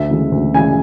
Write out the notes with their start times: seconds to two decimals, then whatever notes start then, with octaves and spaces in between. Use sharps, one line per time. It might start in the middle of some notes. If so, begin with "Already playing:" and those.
Already playing: D2 E5
0.10 C#3 E3 G#3
0.32 D2
0.54 C#3 E3 G#3 G#5